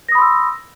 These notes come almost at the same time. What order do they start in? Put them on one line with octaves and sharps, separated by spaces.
A#6 D#6 B5 C6 E6